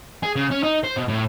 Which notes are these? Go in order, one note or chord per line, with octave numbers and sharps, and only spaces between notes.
G#4
C#3
C#4
D#4
C5
B2
A2